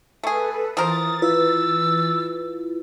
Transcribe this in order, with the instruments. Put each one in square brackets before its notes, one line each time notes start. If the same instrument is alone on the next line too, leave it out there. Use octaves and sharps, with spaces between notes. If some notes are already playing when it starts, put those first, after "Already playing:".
[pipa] A3 G#4 [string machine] A4 B4
[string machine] E3 A6 [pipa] F3 A#4 C5 [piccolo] D#6
[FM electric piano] E4 F4 B4 [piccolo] E6